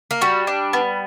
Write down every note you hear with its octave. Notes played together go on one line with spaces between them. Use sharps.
A#3
G3 F#4
D4
B3